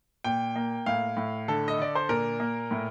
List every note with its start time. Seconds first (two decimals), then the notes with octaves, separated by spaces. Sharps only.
0.24 A#2 G5
0.56 A#3
0.86 A2 F5
1.17 A2
1.48 D3 A4
1.68 D#5
1.79 D3 D5
1.95 C5
2.09 A#2 A#4
2.40 A#3
2.71 A2